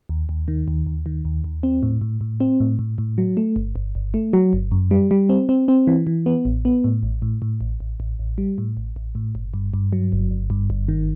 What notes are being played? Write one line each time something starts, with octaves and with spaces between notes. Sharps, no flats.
D#2
D#2
D#3
D#2
D#2
D#3
D#2
D#2
C4
A2
A2
A2
C4
A2
A2
A2
F#3
A3
G1
G1
G1
A3
F#3
G1
F#2
G3
G3
C4
C4
C4
E3
E3
B3
A1
B3
A2
A1
A2
A2
A1
A1
A1
A1
G3
A2
A1
A1
A2
G1
G2
G2
F#3
G1
G1
G2
G1
D#3